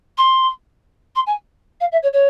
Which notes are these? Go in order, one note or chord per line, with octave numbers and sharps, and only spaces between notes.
C6
C6
G#5
F5
E5
C#5
C#5